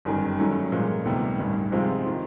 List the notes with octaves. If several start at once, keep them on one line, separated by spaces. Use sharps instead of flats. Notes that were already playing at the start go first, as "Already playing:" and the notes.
G1 F#2 D#3 G3
G2 D#3 F#3 A3 C#4
A#2 F3 G#3
D2 C3 D#3 G3 B3
A1 G2 D#3
C3 F3 G#3 C4 F4
D#3